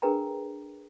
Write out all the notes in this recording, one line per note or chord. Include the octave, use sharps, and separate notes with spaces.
D4 G#4 A#4 B4 G5 A#5